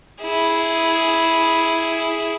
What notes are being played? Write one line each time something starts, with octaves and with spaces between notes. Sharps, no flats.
E4 G#4